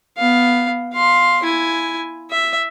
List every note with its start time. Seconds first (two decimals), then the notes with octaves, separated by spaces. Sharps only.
0.18 B3 F5
0.93 F5 C6
1.43 E4 G#5
2.31 E5